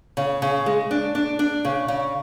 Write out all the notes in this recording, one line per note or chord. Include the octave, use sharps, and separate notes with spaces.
C#3
C#3
G#3
D4
D4
D4
C#3
C#3